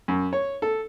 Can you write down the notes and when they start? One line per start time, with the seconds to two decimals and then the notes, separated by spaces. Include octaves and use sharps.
0.08 F#2
0.33 C#5
0.62 A4